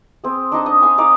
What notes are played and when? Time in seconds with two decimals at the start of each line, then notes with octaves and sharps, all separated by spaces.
0.24 C4 G#4
0.52 D4 D#4 D#5 A5
0.66 D#5
0.82 F5 G#5
0.98 D#4 D5 F5